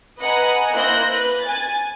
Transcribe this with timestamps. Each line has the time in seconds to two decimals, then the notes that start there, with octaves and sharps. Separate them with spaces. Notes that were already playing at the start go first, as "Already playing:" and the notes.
0.21 B4 D#5 F#5 G#5 A#5
0.73 A#3 E4 C5 F#6 G6 A#6
1.11 B4 F#6
1.42 G#5 A6